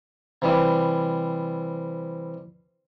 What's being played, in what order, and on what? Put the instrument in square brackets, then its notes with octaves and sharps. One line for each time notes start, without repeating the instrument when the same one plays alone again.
[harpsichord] C3 E3 G3